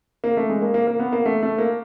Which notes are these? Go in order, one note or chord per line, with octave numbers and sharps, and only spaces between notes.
A#3
A3
G#3
A#3
A#3
A#3
B3
A#3
A3
A3
A#3